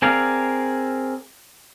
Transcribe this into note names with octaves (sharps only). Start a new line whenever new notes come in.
C4 G#4 A#4 D5 F5